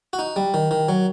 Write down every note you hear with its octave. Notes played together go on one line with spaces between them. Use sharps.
F#4
D#4
G3
D#3
D#3
F#3